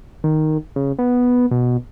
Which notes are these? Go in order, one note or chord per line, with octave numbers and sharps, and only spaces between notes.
D#3
C#3
B3
B2